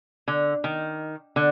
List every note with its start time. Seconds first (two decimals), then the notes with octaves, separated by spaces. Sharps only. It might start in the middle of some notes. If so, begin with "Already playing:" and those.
0.28 D3
0.64 D#3
1.36 D3